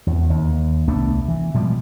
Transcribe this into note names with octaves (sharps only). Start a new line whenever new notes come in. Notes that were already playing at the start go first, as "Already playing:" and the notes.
E2
D#2
C2 A3 B3 D4
E3
B2 F3 G3 G#3